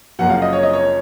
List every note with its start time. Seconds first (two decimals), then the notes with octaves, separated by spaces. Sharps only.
0.19 F#1 F#2 F3 F#5
0.30 F5
0.42 D#5
0.53 C#5
0.63 D#5
0.73 C#5